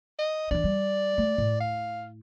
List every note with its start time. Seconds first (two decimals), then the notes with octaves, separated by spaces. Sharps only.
0.19 D#5
0.51 E3 D4 D5
0.64 G3
1.18 A3
1.38 A2
1.60 F5